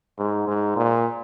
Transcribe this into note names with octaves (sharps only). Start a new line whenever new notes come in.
G#2
G#2
A#2